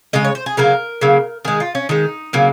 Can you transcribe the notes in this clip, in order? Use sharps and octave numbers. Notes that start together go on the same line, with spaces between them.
C#3 G#3 D#5
C#5
C5
G#4
C#3 F#3 A#3 A#4
C#3 F#3 A#3
D#3 G#3 G#4
F4
C#4
D#3 G#3 D#4
C#3 F#3 A#3